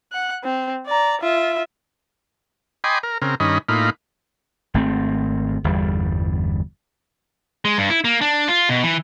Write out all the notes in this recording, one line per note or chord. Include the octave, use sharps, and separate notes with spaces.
F#5 F#6
C4
D5 A#5
F4 E5
D#5 G5 G#5 B5 C6 D6
A#4
C#3 C4 A#4
G2 D#3 C#4 D#5 B5
A2 A#3 D#4 F4 B5
G#1 A3 C4
G1 E2 G3
G#3
G2
E4
A#3
D4
F4
B2
E3